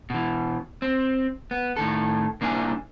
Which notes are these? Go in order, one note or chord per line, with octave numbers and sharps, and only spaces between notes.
B2 E3
C4
B3
A2 D#3 A4
C2 A#3 D4 E4 G#5